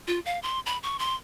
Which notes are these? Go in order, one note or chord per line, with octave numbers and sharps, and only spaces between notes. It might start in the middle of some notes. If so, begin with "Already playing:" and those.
F4
F5
C6
B5
C#6
C6